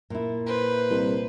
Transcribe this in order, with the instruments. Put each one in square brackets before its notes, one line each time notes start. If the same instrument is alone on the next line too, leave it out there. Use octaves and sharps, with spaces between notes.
[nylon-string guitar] A#2 E4
[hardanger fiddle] B4 C5
[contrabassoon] C2